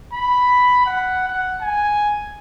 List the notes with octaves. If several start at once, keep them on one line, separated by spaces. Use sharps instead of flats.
B5
F#5
F#5
G#5